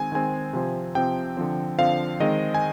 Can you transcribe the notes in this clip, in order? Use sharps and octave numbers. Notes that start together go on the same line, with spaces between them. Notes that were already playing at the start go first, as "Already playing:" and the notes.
Already playing: D#3 G#3 C4 G#5
D#3 G#3 C4 G#5
C3 F3 C4
C3 F3 C4 G5
D3 F3 C4
D3 F3 C4 F5
D#3 G#3 C4 D#5
G#5